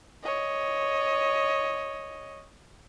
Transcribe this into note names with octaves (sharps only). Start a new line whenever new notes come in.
C#5 D#5